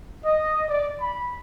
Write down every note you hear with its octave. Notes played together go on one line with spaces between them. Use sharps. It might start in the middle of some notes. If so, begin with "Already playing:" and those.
D#5
D5
B5